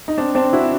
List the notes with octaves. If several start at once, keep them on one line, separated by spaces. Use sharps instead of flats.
D#4
C4 D4
C4 D4
E4 F#4